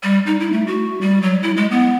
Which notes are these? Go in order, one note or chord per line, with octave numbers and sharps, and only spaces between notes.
G3
D#4
E4
A3
F#4
G3
F#3
E4
G#3
B3